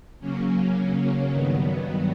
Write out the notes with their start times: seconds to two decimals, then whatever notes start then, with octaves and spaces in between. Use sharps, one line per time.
0.20 C#3 F#3 A#3 C#4
1.30 G2 D#3 F#3 B3